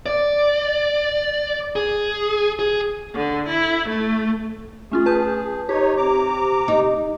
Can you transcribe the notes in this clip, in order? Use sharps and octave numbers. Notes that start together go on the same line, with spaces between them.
D5
G#4
G#4
D3
E4
A3
A3 C#4 F4 G#4
B4 A5 G6
D#4 G4 C#5
C3 A#5 D6
D#4